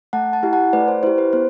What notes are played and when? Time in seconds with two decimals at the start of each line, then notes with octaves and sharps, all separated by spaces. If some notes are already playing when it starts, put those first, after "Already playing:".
0.13 A3 F#5 A5
0.33 F#5 A5
0.43 E4 G4
0.53 F#5 A5
0.73 A3 B4 D5
0.88 C5
1.03 E4 G4 C5
1.18 B4
1.33 B3 C5